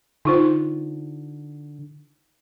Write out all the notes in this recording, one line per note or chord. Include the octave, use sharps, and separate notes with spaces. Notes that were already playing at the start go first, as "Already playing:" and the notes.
D3 D#4 F4 C5